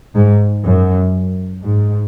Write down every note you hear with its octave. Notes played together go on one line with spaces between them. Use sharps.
G#2
F#2
G#2